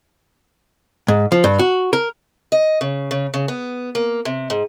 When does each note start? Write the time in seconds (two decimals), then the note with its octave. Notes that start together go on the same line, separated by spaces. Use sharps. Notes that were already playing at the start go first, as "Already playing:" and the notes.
1.08 G#2
1.32 F3
1.44 G2
1.59 F#4
1.93 A#4
2.52 D#5
2.81 C#3
3.11 C#3
3.34 C#3
3.48 B3
3.95 A#3
4.25 C3
4.50 G#2